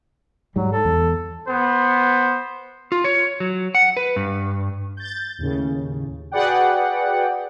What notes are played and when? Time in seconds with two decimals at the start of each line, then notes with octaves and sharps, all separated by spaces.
0.56 G#2 F#3 G3
0.73 A4
0.85 E2
1.46 B3 C5
2.92 F4
3.04 C#5
3.40 F#3
3.75 F#5
3.97 B4
4.16 G2
4.97 G6 A6
5.38 D#2 A2 C#3
6.31 F#4 G#4 B4 D5 F#5 G5